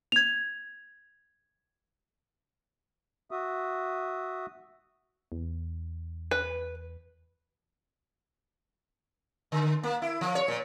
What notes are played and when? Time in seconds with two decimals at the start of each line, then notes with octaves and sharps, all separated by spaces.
0.12 G#6 F7
3.31 F#4 E5 D#6
5.32 E2
6.31 B4
9.52 D3
9.83 A#3
10.02 E4
10.21 F3
10.35 C#5
10.48 A#2